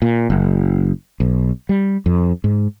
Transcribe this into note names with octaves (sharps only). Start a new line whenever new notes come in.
A#2
F#1
B1
G3
F2
G#2